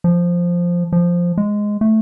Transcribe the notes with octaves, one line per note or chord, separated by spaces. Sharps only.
F3
F3
G#3
A3